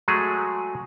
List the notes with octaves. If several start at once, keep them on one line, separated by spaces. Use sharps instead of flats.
F#3 G#3 A3 G#4